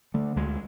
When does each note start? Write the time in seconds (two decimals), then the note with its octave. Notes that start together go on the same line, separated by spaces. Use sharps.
0.14 D3 A3
0.36 D2 G#3